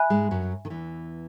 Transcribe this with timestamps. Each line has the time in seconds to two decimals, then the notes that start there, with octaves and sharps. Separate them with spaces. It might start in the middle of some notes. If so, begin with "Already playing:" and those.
Already playing: E5 G#5 B5 F#6
0.10 G#2 G#3
0.31 F#2 F#3
0.65 D#3
0.70 E2 E3